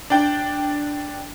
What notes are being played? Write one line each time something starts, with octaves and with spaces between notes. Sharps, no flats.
D4 G5